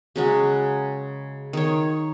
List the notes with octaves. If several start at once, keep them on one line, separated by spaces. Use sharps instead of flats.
C#3 F#3 G#3
D#3 C#5